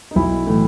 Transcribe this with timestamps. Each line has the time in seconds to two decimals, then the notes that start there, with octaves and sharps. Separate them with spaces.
0.11 D#4
0.16 B1 E4
0.46 A2 E3 A3